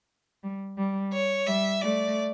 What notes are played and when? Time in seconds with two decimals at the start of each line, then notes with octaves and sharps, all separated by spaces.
0.43 G3
0.77 G3
1.13 C#5
1.47 G3 E5
1.82 A3 D5